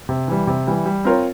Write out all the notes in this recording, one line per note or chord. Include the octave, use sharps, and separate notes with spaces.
C3
E3 G3
C3
E3 G3
G3
C4 F4 A#4 C#5